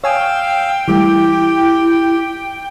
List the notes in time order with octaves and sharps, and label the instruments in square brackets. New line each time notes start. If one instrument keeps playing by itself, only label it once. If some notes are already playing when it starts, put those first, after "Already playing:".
[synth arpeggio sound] C#5 G#5 D#6 [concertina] F5 E6 [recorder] G5
[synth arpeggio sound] E3 G3 A3 [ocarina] E4 [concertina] G4